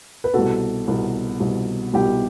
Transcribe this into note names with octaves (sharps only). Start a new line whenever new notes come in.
B4
C2 B2 F#4 A4
C2 B2
C2 B2
C2 B2 G4